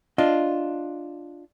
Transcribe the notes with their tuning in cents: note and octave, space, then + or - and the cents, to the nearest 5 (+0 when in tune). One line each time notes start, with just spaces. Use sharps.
D4 +0 F4 +0 D#5 +0